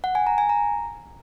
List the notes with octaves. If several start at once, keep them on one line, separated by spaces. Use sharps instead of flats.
F#5
G#5
A#5
G#5
A#5